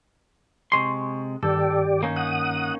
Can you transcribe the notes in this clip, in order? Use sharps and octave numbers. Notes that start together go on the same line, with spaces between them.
C3 G#3 C6 C#6
G2 D#3 G4 A4 D5
A#3 C#4 D#4
F#5 D#6